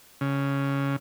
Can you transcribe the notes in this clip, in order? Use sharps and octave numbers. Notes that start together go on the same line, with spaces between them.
C#3